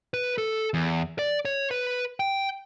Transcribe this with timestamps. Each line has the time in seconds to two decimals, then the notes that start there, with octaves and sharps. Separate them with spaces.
0.14 B4
0.38 A4
0.74 E2
1.19 D5
1.45 C#5
1.71 B4
2.20 G5